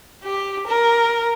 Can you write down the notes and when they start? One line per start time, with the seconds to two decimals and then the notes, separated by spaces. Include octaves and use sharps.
0.24 G4
0.67 A#4